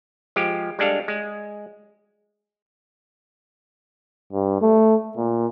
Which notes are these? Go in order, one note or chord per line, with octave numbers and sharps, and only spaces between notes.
F3 G#3 G4
G3 G#3 D4 A4 F5
G#3
G2
A3
A#2